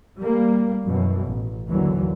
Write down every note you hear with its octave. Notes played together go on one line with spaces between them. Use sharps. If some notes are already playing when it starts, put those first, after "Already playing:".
G3 A#3
F#2 B2 E3
A1
D#2 D3 E3 F#3